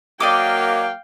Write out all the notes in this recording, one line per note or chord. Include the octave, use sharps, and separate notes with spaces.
F#3 A#3 D5 D#5 F5 G5 D6